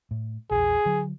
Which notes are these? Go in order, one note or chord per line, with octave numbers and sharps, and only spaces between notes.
A2
A#1 E2 G#4
D3 F#3